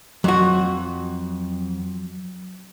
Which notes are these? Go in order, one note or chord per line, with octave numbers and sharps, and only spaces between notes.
F2 F#3 F#4